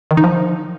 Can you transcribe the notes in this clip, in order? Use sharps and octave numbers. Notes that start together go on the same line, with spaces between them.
D#3
D#4
F3